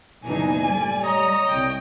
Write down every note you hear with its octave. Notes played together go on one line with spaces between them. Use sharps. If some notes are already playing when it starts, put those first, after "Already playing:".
F#1 B2 E3 D4 D#4 G#5
A2 G3 D5
C#5 D#5 A#5
C2 G5